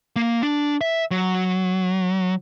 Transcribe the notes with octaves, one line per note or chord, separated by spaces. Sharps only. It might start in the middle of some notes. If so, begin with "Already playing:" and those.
A#3
D4
E5
F#3